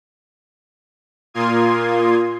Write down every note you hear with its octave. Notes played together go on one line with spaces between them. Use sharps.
A#2 A#3 F4 C6 D#6 G#6